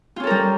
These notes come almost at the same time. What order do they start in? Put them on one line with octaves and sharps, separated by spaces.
F4 C#4 A4 A#4 G3